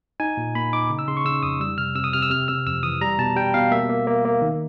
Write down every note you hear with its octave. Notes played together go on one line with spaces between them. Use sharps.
D#4 G#5
A#2
A#3 B5
D#4 D6
C#3
E6
C#3 C6
C#6
C#3 E6
F2 D#6
G3 E6
C3 F6
C3 E6
D#6
C3 F6
E6
C3 F6
C3 E6
F2 E6
E3 D#6
G3 A#5
B2 A5
G3 G5
B2 F5
A#3 E5
A#3
A#3
A#3
D#3